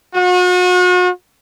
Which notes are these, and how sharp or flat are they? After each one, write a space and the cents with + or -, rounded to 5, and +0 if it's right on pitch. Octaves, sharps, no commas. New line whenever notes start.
F#4 -40